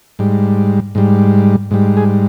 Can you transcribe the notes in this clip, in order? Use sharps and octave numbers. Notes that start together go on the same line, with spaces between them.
G#2 G3
G#2 G3
G#2 G3
G#4